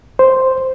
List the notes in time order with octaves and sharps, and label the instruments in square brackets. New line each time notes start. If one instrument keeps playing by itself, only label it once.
[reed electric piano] C5